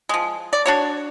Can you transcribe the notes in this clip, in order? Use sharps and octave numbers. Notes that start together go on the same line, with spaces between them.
F3 G#3
D5
D4 F#4 C#5